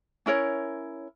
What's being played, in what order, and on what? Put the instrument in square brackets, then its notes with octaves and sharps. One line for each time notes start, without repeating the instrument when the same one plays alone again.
[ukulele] C#4 E4 A#4 C#5